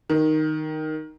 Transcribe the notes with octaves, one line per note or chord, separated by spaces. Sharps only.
D#3